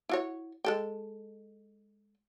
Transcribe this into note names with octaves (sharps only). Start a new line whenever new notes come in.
E4 F#4 C#5
G#3 A4 G5